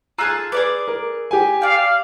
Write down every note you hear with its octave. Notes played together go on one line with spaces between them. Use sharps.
F4 G#4 A5 A#5 E6 F#6
G#4 B4 D5 D6
A#4
G4 G#5
D5 F5 G5